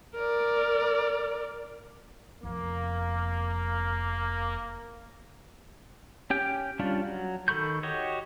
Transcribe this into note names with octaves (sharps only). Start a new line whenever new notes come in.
A#4 D5
F1 F2 A#3
C#4 G4 G5
G3 C#4 D4 F4
F#3
D#3 A4 B5 C#6 G6
F#4 G4 C#5 D#5